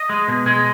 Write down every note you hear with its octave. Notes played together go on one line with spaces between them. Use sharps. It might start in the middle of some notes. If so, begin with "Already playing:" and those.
Already playing: D#5
G#3
B2
G#3